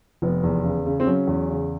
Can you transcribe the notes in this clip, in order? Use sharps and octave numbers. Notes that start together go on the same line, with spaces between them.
F1 B3
E2
C#3
C#3
C4
F#3 C#4
E2
C#3